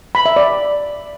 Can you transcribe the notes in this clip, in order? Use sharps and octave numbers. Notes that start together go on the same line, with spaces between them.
B5
E5
D5